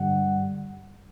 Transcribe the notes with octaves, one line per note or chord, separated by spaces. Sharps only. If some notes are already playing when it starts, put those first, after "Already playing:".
Already playing: G2 D3 G3 F#5